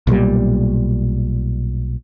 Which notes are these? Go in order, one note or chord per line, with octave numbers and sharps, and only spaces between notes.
B1 A#2 F#3 G3